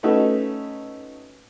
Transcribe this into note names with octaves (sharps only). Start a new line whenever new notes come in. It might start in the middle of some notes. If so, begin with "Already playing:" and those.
A3 C#4 D#4 F#4 A4 B4